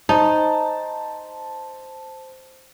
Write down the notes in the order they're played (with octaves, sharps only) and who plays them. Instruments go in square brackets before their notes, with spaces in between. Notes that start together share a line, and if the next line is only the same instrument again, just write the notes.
[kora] D#4 [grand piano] C5 A5